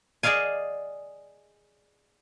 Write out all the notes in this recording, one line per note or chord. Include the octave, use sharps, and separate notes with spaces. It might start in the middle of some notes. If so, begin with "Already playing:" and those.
G#4 D5 D#5 F5 G#5